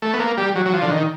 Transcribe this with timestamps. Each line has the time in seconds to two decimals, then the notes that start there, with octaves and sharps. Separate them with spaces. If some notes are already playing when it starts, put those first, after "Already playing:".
0.02 A3
0.14 B3
0.20 A#3
0.37 G3
0.56 F#3
0.66 F#3
0.73 F3
0.82 D3
0.90 D#3